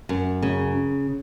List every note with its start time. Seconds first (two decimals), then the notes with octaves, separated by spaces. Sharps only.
0.09 F#2
0.42 C#3